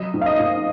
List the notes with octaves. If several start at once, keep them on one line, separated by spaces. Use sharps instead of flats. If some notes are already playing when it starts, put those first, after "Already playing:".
Already playing: F#3 D#5
G#2
F5
D#5
G#2